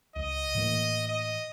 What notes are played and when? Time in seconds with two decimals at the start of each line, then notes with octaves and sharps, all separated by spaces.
0.16 C#2 D#5
0.55 A2 E3 A#3
1.08 D#5